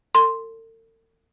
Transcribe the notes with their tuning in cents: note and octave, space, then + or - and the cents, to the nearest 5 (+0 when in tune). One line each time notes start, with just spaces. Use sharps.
A4 +45 C6 +0